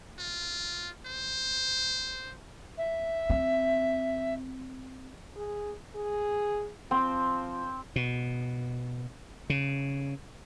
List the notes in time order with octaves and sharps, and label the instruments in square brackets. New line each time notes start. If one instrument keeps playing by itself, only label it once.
[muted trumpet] F4
C5
[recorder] E5
[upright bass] C4
[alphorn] G#4
G#4
[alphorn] F3 [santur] C4
[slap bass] B2
C#3